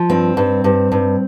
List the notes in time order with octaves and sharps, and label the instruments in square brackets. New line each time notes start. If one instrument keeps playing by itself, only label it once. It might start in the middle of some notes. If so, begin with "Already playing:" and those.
Already playing: [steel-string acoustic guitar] F3
G2 C4
G2
G2
G2